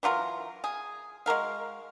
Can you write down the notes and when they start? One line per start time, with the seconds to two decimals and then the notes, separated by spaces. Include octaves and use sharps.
0.03 E3 F#3 F4 A#4
0.64 G#4
1.26 G#3 F#4 A#4 F5